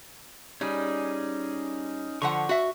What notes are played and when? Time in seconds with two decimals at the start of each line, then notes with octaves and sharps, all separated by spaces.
0.61 G3 C#4 D#4 G#4
2.22 D3 F3 F#5 C#6
2.49 F#4 E5